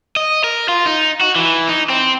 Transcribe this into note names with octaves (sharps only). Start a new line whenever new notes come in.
D#5
A#4
F4
D#4
F#4
E3
D#4
C4